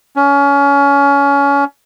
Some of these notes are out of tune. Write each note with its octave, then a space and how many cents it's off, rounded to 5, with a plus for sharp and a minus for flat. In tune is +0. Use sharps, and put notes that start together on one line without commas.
C#4 +25